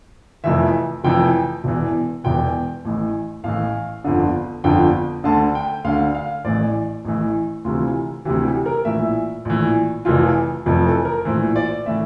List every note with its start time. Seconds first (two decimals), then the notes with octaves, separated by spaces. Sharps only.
0.44 F1 F2 E3 E5
1.04 F1 F2 E3 G5
1.64 E1 E2 E3
2.24 E1 E2 E3 G5
2.85 A1 A2 E3
3.44 A1 A2 E3 F5
4.04 G1 F2 D3
4.64 G1 F2 D3 G5
5.24 D2 D3 A5
5.55 G5
5.84 D2 D3 F5
6.15 F5
6.45 A1 A2 E3 D5
7.05 A1 A2 E3
7.64 D2 C3 E3 F4
8.25 D2 C3 E3 G4
8.45 G4
8.66 A#4
8.85 A#1 A2 E3 E5
9.45 A#1 A2 E3
10.05 F1 F2 E3 F4
10.66 F1 F2 E3
10.86 A4
11.05 A#4
11.25 A#1 A2 E3 C5
11.56 D5
11.86 A2 E3 E5